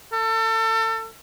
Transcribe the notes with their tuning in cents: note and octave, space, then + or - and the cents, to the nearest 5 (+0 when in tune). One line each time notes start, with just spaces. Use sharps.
A4 +30